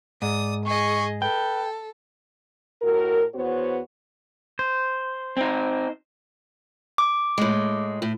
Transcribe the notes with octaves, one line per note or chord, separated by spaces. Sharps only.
G#2 D5 D#6
G#4 D#5 C#6
A4 B4 G5
A2 F#4 A#4
E2 B3 F#4 C5 C#5
C5
C4 D#4
D6
A2 G#3
A2